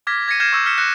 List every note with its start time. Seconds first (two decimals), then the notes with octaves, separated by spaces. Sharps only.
0.07 D6 F6 G#6 A#6 B6
0.28 G#6 A#6 B6 C#7 D#7
0.40 F6 G6 G#6 A#6 C7 E7
0.53 C#6 E6 G6 C#7
0.66 F6 B6 C#7 E7
0.78 F#6 A#6 C#7